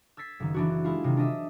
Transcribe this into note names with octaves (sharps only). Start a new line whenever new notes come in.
E6 G#6 A6 B6 C7
F#1 D#3
E3 D4 F#4
G#3 E4 F4
C3 D#3
D4 D#5 E5